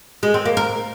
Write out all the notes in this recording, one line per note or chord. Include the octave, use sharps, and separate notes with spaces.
G#3
C4
A#3
A#4